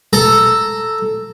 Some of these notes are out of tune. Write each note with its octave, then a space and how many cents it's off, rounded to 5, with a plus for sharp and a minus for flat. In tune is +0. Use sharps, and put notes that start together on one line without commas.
A4 +0 A#5 -10